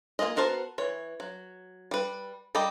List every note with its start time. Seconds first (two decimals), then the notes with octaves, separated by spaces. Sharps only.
0.19 A#3 D#4 F4 G#4 D#5
0.36 B3 F#4 A#4 C5 A5
0.78 E3 C#5
1.20 F#3
1.91 G3 B4
2.55 G3 G4 D#5 A#5 B5